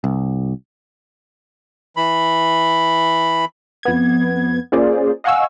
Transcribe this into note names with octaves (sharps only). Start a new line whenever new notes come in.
C2
E3 B5
F2 B3 G#6
A#3 C#4 F4 G#4 C5 D5
D#5 F5 F#5 G#5 C#6 E6